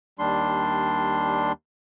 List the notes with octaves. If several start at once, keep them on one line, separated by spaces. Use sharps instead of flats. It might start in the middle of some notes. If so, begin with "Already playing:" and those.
D#2 G3 D4 C6